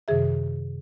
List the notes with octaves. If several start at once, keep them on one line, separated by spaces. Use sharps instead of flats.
F#2 C3 D#3 G#4 E5